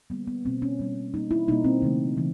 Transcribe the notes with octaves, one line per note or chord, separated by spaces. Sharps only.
D3 G3 A#3 B3
B3
B2 G3 A#3 C4
C#4
B2 G3 A#3
B2 G3 A#3 D#4
E4
B2 G3 A#3 D#4
C4
C#3 E3 A3
C#3 E3